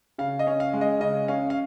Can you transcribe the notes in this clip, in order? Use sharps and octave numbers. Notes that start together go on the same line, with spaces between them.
C#3 F5
D#5
C#4
F5
G#3
D#5
C#3 D#5
C#4 F5
F5